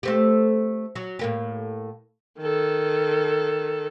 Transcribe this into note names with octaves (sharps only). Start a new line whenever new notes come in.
A3 C4 G4
F#3
A2 A#3 G4
D#3 A4